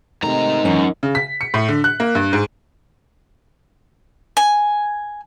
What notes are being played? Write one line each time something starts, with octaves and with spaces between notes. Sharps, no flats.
G#2 C3 D#3 A3 A#5
F#2 E3 A#3 C#4
C#3
B6
C#7
A2
D3
F#6
A#3
G2
G#2
G#5